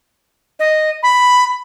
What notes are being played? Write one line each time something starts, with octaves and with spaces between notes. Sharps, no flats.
D#5
B5